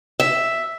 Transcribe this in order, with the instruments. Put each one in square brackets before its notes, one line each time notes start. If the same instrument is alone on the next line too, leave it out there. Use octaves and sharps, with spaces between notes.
[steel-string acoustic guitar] E5